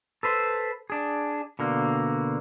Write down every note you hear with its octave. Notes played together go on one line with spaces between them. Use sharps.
A4 B4 C5
D4 G#4
B2 D3 A#3